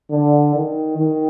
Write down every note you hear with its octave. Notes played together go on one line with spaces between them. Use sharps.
D3
D#3
D#3